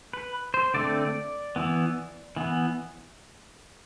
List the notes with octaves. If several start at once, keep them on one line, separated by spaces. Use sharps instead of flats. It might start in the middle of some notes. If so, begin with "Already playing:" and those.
B4
C5
D3 A3 C4 D5
E3 B3
E3 B3